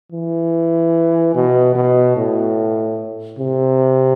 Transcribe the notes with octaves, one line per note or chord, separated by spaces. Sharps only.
E3
B2
B2
A2
C3